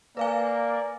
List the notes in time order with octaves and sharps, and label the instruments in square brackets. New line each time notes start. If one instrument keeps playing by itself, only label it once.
[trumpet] A#3 [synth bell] B4 F5 G#5 [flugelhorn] D5